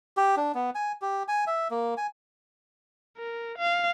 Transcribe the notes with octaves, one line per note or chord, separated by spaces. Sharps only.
G4
D4
B3
G#5
G4
G#5
E5
A#3
G#5
A#4
F5